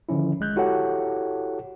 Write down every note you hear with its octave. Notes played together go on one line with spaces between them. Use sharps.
D3 D#3 F3 C#4 E4
G1 G#3 F#6 G6
E4 F#4 G4 A4 C#5 F#5